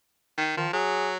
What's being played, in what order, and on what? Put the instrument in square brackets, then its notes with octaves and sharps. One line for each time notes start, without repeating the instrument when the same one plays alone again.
[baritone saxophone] D#3
[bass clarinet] D#3 [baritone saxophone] F3
[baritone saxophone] F#3 [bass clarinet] G#4